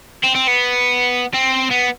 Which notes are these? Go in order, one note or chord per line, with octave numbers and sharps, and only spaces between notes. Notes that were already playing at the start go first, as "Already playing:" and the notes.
C4
C4
B3
C4
B3